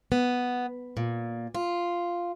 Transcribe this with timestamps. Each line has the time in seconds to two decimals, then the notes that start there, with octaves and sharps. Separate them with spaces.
0.12 B3
0.97 A#2
1.55 F4